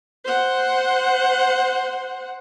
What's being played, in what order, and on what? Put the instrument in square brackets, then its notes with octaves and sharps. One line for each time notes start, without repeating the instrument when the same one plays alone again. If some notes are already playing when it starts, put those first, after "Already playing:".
[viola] C5 F#5